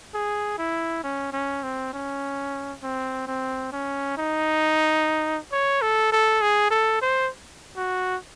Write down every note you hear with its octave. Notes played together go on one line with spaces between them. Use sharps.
G#4
E4
C#4
C#4
C4
C#4
C4
C4
C#4
D#4
C#5
A4
A4
G#4
A4
C5
F#4